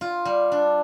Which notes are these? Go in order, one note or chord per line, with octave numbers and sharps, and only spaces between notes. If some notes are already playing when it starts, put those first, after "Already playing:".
F4
G3
D4